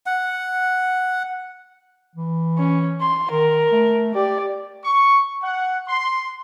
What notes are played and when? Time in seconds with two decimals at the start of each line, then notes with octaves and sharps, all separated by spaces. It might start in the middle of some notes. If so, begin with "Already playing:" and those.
0.06 F#5
2.16 E3
2.58 C#4
3.01 C6
3.31 D#3 A#4
3.71 A3
4.15 G4 D5
4.84 C#6
5.43 F#5
5.88 C6